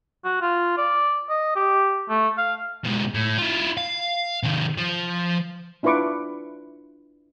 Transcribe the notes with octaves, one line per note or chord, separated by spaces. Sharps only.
F#4
F4
D5
D#5
G4
A3
F5
G#2 B2
A2
E4 F4
F5
C3 D#3
F3
D4 E4 F4 B4 C#6 D6